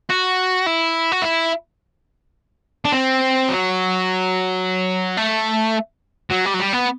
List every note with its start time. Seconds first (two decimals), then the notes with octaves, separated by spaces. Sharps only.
0.10 F#4
0.67 E4
1.12 F#4
1.22 E4
2.85 D4
2.92 C4
3.49 F#3
5.17 A3
6.30 F#3
6.45 G3
6.54 F#3
6.59 G3
6.73 B3